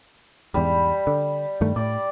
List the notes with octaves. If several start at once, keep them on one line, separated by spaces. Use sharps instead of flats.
E2 G#2 G3
D3
G2 D#3 A3
A2 D5